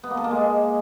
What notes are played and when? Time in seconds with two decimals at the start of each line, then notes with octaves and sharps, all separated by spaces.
0.04 B3
0.10 A#3
0.17 A4
0.24 A#3
0.31 G#3